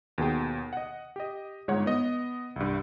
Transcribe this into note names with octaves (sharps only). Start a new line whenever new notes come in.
D#2 B2 G#4 G5
D#5 F#5
G4 D#5
G1 G#2 G#3 D#4 C#5 F#5
B3 D#5
C2 G2